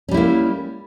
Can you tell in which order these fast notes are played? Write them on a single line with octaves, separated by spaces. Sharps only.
C#4 G3 E4 A#3